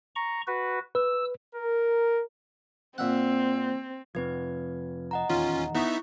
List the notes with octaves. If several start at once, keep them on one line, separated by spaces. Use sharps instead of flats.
A#5 C#6
F#4 B4
B4 E6
A#4
A#2 C4 E5 F#5
F2 C3 F3 C4 B4 G#6
D#5 F#5 A#5
D#1 E2 D#3 C#4 F4
B3 D#4 E4 E5 C#6